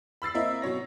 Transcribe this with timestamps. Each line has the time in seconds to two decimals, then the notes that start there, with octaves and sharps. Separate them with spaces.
0.22 B5 E6 A6 C7
0.35 A#3 C4 E4 A#4 D#5 E5
0.62 B2 F#3 C#5 A#6